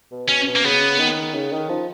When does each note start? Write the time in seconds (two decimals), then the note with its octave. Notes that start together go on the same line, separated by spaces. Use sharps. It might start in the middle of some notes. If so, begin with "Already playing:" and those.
0.11 B2
0.28 B2 C#4
0.47 B2
0.56 A#3
0.64 C#3 B3
1.00 D#3
1.35 C#3
1.52 D#3
1.69 F3